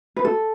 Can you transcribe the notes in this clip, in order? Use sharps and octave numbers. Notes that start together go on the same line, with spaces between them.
B4
A4